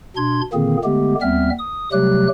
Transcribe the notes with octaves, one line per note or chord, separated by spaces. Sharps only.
B2 D4 C6 G#6
A#2 D3 D#3 A#3 C4 G#4
D3 G#3 A3 B3 G4
D#2 G3 B3 C4 E5 F6
D#6
C3 F#3 G3 A3 G4 F#6